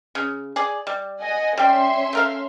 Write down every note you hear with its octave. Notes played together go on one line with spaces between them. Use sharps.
C#3
G#4 D5
G3
D#5 F#5 G#5
G3 C#4 E5 G5 C6
A3 A#4 F5